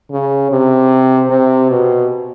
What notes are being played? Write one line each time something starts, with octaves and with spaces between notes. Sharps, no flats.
C#3
C3
C3
B2